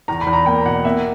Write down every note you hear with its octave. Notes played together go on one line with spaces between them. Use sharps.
E2 A#5
B5
E2
A#5
A#3 G5
B2 F#5
A#3 E5